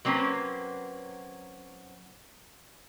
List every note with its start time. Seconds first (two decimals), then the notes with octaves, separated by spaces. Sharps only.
0.05 F#3 A#3 C4 C#4 B4